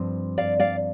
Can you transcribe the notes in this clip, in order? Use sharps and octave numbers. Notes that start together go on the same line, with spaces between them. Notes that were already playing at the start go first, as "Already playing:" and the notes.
Already playing: G2 F3 C4
D5 F5
D5 F5